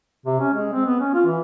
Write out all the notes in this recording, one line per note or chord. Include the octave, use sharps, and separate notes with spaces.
C3
C#4
G#3
C4
B3
C#4
F4
E3